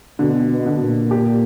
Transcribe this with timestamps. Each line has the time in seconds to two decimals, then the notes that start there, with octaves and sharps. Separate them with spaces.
0.19 B2 D3
0.50 B2
0.66 D3
0.80 A#2
1.11 G4